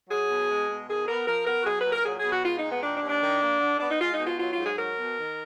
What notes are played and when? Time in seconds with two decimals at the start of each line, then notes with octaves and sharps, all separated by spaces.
0.09 F#3 G#4
0.29 B2
0.48 G#3
0.68 B2
0.88 D#3 G#4
1.07 B3 A#4
1.26 F3 A#4
1.46 B3 A#4
1.60 F#4
1.65 F#3 G#4
1.79 B4
1.85 A#2
1.92 A#4
2.05 F#3 G#4
2.18 G#4
2.25 B2
2.31 F#4
2.43 G#3 F4
2.57 D#4
2.63 A#2
2.70 B3
2.82 D#3 D4
2.96 D4
3.02 D#2
3.08 D4
3.21 D#3
3.41 A#3
3.60 D3
3.79 B3 D4
3.90 D#4
4.00 G#3 F4
4.12 D#4
4.19 B2
4.26 F4
4.39 F#3 F4
4.51 F4
4.58 G#2
4.64 G#4
4.77 F#3 A#4
4.97 B2
5.17 D#3